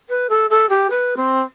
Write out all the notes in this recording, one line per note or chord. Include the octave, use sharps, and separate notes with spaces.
B4
A4
A4
G4
B4
C4